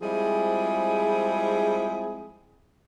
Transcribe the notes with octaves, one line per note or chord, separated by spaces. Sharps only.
F3 G3 G#3 C4 E4 G#4